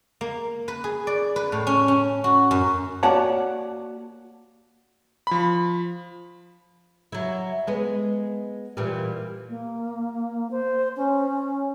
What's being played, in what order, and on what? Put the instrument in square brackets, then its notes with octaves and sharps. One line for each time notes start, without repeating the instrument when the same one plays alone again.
[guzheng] A#3
B4
G#4
D5
B4
A2
C#4
C#4
F#4
F#2
[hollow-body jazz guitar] A#3 F#4 C#5 D5 F#5 A5
[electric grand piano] F3 B5
[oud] F#3 E4
G#3 B3
A#2 E3 G3
[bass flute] A#3
C5
C#4